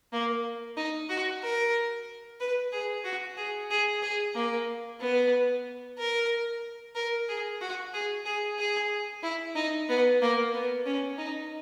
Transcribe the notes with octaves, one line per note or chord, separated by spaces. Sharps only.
A#3
D#4
F#4
A#4
B4
G#4
F#4
G#4
G#4
G#4
A#3
B3
A#4
A#4
G#4
F#4
G#4
G#4
G#4
E4
D#4
B3
A#3
B3
C#4
D#4